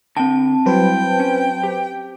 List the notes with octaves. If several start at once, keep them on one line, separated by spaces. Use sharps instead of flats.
D3 C4 G5 A5
F#3 G3 E4 B4 C5 G5
C#4
G4